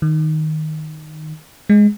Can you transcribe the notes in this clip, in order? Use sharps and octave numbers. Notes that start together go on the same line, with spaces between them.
D#3
G#3